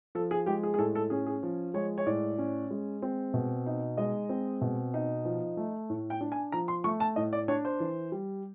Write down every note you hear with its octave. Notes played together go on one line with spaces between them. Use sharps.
F3 A4
G#4
G#3 G4
G#4
G#4
A2 A4
A4
C#4 G#4
G#4
F3
G#3 C#5
C#5
A2 D5
C#4
G#3
C4
B2
D#4
G#3 D#5
C4
B2
D#4
F3
A3
A2
G5
D4
G#5
F3 A#5
C6
A3 C#6
A5
A2 D#5
D5
D4 C#5
C5
E3
G3